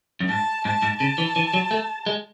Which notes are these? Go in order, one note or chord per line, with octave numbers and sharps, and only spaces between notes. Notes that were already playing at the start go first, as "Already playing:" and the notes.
F#2
G#2 A5
G#2 A5
G#2
C#3 A5
E3
E3
F#3
A3
G#3